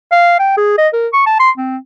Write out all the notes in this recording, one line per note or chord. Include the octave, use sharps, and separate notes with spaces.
F5
G5
G#4
D#5
A#4
C#6
A5
C6
C4